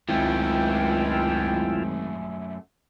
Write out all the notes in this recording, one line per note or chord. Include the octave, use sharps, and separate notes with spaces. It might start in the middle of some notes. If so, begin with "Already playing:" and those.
G#1 C#2 F#2 A3 E4 F4 G5